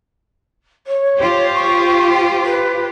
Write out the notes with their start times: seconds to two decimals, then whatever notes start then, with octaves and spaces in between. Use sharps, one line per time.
0.87 C#5
1.18 F4 G4 C5
1.53 C#6
2.14 G5
2.45 B4